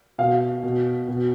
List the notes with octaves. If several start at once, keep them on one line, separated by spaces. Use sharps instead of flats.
B2 F5
B2
B2